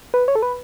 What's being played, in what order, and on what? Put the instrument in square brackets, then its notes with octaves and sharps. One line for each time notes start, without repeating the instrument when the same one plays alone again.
[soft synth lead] B4
C#5
A4
B4